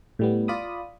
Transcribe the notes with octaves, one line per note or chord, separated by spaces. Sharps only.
A2 G3 B3
F4 D5 B5 D#6